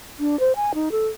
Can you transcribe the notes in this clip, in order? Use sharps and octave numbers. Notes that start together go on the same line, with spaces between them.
D4
C5
G#5
D#4
A4